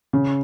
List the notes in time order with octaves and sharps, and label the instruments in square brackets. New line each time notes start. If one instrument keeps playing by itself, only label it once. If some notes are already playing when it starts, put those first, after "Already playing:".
[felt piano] C#3